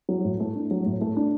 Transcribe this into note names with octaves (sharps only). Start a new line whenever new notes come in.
F#3
A2
A3
D4
F#3
A2
A3
D4